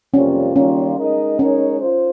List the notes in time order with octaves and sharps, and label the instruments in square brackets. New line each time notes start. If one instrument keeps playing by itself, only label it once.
[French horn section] F2 C3 G3 A#3 F4 [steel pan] C#4
[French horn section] D#3 G3 A#3 F4 [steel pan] C#4
[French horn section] G#3 D#4 A#4 D#5
[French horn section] G#3 D#4 A#4 C#5 [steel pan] C#4
[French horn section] F4 C5